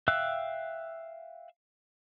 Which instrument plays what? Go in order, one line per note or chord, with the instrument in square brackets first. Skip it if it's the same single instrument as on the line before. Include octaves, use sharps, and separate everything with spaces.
[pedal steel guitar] E5 F5 G5 E6 F#6